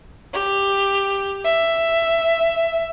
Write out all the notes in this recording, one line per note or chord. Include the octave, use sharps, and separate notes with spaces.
G4
E5